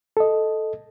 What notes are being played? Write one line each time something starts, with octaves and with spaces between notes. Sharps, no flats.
A4 D#5